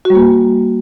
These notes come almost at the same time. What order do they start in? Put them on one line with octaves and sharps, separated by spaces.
F#4 G3 A#3